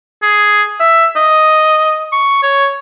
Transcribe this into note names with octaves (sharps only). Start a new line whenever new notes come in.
G#4
E5
D#5
C#6
C#5